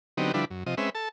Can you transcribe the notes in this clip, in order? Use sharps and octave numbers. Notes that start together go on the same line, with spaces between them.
D3 F#3 B3 C4 D#4 G4
D3 F3 G3 D4 E4 B4
F#2
C3 F3 D#5
G#3 C4 C#4 B4 E5
A4 A5